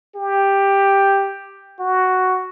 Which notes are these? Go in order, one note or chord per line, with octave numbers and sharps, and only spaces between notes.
G4
F#4